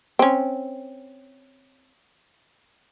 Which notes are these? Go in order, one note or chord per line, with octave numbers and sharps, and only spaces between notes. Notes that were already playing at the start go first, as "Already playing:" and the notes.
C4 C#4